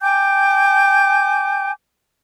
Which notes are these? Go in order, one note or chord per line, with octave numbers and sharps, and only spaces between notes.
G5 G#5 D6 G6